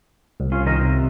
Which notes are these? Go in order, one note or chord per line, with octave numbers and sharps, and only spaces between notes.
C2
C#4 F4
D#3 A#4 D#5
C3